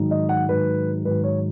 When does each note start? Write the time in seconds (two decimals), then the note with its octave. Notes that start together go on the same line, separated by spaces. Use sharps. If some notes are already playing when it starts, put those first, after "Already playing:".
Already playing: G#2 D#3 F#3 D#4
0.11 D#5
0.29 F#5
0.48 G#2 D#3 F#3 D#4 B4
1.05 G#2 D#3 F#3 D#4 B4
1.24 C#5